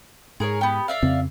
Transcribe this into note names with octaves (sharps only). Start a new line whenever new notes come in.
G#2 G#4 A#4 C#5
B3 G4
D5 E5 F5
F2 C#3 C4